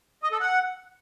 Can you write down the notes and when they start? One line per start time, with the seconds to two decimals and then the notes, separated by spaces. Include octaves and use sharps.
0.23 D#5
0.32 A4
0.41 F#5